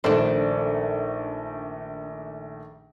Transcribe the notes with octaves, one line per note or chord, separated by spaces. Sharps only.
A#1 D#3 A3 D4 A4 C5